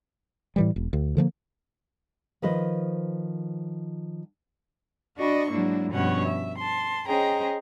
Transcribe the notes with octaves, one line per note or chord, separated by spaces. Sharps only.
A2 E3 G3
E1
D2
D3 F3 G#3 A#3
D#3 F3 B4 C5 D#5
D4 F#4 D5 D#5 B5 C#6
G#2 F#3 A#3 D4 E4
G2 B2 F3 C#4 C#5 F#5
E5
A5 C6
C#4 G#4 C5 D#5 G5 A#5